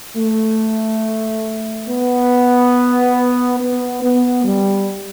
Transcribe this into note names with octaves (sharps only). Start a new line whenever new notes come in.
A3
B3
B3
B3
G3